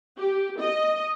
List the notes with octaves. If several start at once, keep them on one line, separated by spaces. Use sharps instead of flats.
G4
D#5